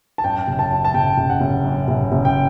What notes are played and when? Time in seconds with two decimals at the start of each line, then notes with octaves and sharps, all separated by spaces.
0.18 A5
0.24 F#2 G5
0.47 F#1
0.59 A5
0.71 F#2
0.85 A5
0.94 F#1 G5
1.18 F#1
1.30 F#5
1.41 F#1
1.64 F#2
1.88 F#1
2.12 F#1
2.25 G5